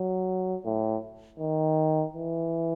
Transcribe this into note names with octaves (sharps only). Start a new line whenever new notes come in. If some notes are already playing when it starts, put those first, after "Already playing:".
Already playing: F#3
A2
D#3
E3